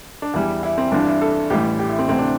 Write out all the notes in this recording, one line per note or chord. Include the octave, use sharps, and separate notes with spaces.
D4
E2 E3 G3 E4
E4
C4
G1 G2 E3 D4
E4
A4
A1 A2 E3 G3 G4
G4
E4
C4
D2 C3 E3 C4
D4